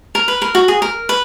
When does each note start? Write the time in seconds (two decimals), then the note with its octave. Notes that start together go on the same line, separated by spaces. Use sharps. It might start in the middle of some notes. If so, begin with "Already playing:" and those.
0.15 A#4
0.28 B4
0.42 A#4
0.55 F#4
0.68 G#4
0.82 A#4
1.09 B4